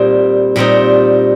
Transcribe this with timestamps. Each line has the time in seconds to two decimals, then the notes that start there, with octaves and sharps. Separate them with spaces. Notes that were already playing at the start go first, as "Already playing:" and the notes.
Already playing: A#2 G3 C4 D#4
0.56 A#2 G3 C4 D#4